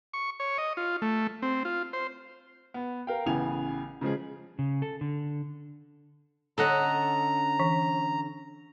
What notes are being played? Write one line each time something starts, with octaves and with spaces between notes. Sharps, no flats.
C#6
C#5
D#5
F4
A3
C4
F4
C5
B3
A#4 F5 G5
A1 C#3 E3 B3 G#5 F7
C#3 F3 G#3 G#4
C#3
A4
D3
D3 C#4 A4 D#5 F#5 A#5
E3